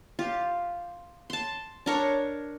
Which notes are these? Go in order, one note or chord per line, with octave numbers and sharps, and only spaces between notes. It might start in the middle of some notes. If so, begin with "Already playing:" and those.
F4 G4
A5 C6
D4 A#4 C#5